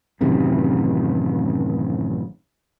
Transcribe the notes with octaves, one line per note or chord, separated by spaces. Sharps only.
A1 F#2 C3 D#3